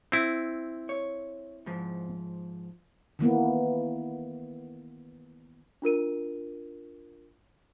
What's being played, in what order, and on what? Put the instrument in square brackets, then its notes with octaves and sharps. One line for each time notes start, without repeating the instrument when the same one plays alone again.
[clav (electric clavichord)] C4 E4
[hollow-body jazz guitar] C#5
G#2 F3
[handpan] D#3 E3 A#3 B3
[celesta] D4 F4 A#4 D#7